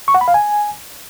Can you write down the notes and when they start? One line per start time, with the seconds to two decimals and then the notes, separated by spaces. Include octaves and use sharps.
0.08 C#6
0.15 F#5
0.21 B5
0.28 F5
0.34 G#5